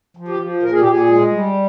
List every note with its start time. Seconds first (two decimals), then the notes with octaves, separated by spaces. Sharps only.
0.17 F3
0.28 G4
0.40 F3
0.63 A#2 A#4
0.72 G#4
0.80 G4
0.86 A#2 G#4
1.09 G#3
1.31 G3